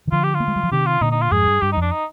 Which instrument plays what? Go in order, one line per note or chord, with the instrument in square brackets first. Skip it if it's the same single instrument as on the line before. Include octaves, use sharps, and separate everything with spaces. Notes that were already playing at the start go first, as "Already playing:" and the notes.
[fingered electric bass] D#3
[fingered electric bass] D3 F3 [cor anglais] F4
[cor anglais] G4
F4
[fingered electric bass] A#3
G#3
G3
F3
[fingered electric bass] C3 D#3 [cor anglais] G4
[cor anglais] F4
[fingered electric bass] A#2 D3 [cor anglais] D#4
[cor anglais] D#4
F4
[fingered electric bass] F2 G#2 [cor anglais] G#4
[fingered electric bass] G2
[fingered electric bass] G2 [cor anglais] G4
[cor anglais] D#4
[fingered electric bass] F2 [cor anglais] D4
[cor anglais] D#4